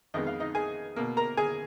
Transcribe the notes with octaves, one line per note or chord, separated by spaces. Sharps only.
F2 D#3 G#3 B3 D#5
F5
D#4 D#5
G#4 G#5
B2 A#3
A#4 A#5
G#4 G#5